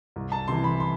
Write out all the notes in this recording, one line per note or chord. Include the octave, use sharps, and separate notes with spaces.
C2
A5
C3 E3 C6
B5
C6